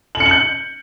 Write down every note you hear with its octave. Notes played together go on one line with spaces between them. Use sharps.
F#7
C#7
F#7
G6